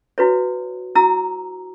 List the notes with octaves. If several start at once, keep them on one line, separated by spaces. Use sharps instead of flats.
E4 F#4 B4 C#5
E4 F#4 A#5 E6